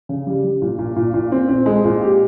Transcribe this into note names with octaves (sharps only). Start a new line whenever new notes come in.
C#3
G3
G3
A#2
A#2
A#2
A#2
C4
C4
G#3
A#2
G4